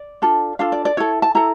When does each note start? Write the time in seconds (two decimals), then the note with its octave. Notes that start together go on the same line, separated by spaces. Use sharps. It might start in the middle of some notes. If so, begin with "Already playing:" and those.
Already playing: D5
0.22 D4 F4 A4
0.59 D4 F4 A4 F5
0.72 D5
0.85 D5
0.97 E4 A4 C#5
1.22 A5
1.35 E4 A4 A#5